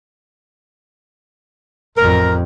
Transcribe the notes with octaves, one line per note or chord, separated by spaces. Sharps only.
A1 F2 A#4